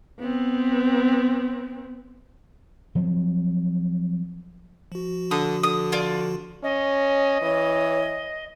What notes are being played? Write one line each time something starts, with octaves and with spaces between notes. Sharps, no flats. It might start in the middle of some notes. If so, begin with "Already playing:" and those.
B3 C4
F3 F#3 C4
F3 F#4
D3 D#6
D3 D#6
F4 D5
C#4 D#5
E3 C#5